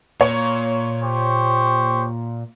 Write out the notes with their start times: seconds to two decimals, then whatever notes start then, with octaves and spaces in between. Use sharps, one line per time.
0.21 A#2 C#5
1.03 G4 C5 C#6